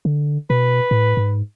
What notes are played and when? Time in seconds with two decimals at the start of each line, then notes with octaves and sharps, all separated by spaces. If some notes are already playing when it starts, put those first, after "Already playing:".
0.05 D3
0.50 B2 B4
0.91 A2
1.17 G#2